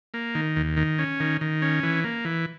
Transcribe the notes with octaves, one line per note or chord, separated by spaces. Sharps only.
A#3
D#3
D#2
D#3
C#4
D#3
D#3
C#4
E3
A#3
E3